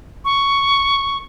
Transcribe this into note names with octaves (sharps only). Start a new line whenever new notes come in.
C#6